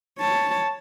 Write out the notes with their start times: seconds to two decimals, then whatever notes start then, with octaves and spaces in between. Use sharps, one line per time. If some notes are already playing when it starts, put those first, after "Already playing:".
0.18 C#5 A5